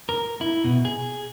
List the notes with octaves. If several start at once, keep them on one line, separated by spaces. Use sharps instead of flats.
A#4
E4
B2
G#4